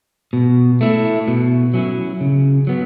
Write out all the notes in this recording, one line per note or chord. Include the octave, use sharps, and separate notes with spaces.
B2
A3 E4
B2
F#3 C#4 E4
C#3
F#3 B3